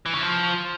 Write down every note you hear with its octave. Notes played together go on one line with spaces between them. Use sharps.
E3
C#3
F3